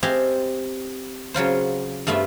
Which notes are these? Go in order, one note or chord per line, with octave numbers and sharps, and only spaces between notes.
C4 G4 D#5 F5 G#5 A5
C#3 F#3 F4 C5
G2 A3 B3 F4 E5